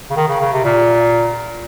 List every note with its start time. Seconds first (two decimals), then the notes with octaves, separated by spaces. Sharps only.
0.10 C#3
0.16 D#3
0.28 C#3
0.40 C#3
0.53 C3
0.64 A#2